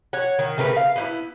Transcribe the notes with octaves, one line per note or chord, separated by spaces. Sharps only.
C#5 F#5
D#3
C#3 A3 A#4 B4
F5
B3 D#4 E4